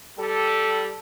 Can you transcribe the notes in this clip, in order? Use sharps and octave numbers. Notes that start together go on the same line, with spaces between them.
G3 A4